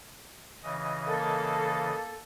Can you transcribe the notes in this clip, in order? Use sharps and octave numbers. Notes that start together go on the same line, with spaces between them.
C#3 E3 D#5
A#3 A4